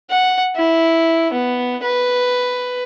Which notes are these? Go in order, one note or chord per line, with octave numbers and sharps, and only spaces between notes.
F#5
E4
B3
B4